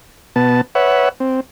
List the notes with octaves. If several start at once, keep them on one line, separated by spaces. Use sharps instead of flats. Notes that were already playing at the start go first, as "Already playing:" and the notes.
B2 B3 A5
B4 C#5 E5 F#5
C4